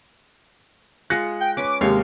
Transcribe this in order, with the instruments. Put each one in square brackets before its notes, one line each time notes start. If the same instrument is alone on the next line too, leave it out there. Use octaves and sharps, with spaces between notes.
[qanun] G#3 F4 [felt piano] F#6 A#6 C#7
[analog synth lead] G5
[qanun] C#4 B4 [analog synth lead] D6
[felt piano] D#2 C3 [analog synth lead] G#3 [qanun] C#5 F5